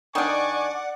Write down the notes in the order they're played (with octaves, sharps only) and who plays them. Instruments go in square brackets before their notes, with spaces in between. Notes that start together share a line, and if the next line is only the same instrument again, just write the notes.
[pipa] D#3 D4 [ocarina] D5 [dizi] F#5 [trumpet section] G#5 C#6 D6